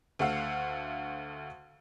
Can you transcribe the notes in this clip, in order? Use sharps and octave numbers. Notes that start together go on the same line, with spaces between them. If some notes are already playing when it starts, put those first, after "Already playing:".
D2 A3 F5 F#5 E6 C7